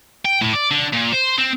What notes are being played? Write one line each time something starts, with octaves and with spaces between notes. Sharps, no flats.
G5
A2
D5
D3
A#2
C5
C4